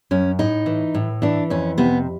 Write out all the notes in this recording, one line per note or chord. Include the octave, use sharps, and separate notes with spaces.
F#2 C#4
A2 D#4
E3
A2
E3 D4
F2 C#4
C3 B3